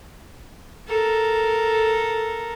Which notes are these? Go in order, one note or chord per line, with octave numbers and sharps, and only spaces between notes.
A4 A#4